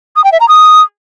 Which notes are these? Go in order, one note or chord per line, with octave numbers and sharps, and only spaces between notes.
D#6
G5
E5
A#5
D#6